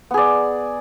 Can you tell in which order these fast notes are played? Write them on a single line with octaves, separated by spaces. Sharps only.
B3 G#4 D5